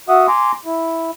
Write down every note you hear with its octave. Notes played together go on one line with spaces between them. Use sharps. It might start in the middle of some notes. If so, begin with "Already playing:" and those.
F#4 E5 F#5 D#6
G#5 A#5 C6 D6
E4